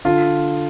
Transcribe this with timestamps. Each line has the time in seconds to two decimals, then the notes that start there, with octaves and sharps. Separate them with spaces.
0.05 D3 F4